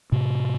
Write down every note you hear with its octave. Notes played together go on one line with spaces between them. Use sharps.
A2 C3